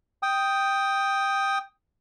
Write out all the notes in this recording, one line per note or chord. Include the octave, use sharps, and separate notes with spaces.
G5 D#6